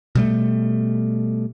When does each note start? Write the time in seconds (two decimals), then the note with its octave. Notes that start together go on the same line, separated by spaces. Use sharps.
0.15 B2 G3 A3